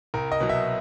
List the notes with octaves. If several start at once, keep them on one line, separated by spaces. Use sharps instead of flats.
C2 A#4
D#5
B2 F#3
E5